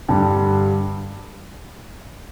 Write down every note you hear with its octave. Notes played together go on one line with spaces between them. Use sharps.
G2 D3 G3